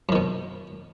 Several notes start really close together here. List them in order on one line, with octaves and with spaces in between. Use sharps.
F#2 D#3 B2